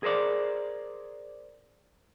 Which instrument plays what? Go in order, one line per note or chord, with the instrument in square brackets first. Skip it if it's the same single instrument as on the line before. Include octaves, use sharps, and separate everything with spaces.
[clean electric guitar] G#4 A#4 C5 D5